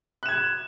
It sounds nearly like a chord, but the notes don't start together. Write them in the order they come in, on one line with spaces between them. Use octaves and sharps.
F#6 E7 G#6